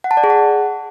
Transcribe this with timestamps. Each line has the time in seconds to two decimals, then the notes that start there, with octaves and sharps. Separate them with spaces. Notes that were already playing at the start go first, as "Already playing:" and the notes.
0.04 F#5
0.11 A5
0.17 D5
0.24 G#4
0.30 F#5